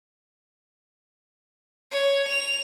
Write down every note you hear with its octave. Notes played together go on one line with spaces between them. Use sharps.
C#5
F7